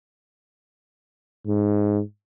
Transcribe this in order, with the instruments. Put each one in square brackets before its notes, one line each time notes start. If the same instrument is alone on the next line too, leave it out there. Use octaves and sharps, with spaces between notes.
[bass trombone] G#2